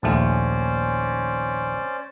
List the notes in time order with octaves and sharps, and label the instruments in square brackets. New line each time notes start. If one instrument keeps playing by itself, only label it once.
[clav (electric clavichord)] A#1 D#2 A3 [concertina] C#4 C5 D5